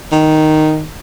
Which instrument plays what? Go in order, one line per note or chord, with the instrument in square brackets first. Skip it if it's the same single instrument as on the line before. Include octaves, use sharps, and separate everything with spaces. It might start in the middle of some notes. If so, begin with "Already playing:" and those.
[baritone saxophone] D#3